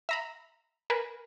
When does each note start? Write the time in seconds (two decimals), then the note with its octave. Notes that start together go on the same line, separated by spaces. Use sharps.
0.09 E5 A#5 B5
0.90 A#4 B4 G#5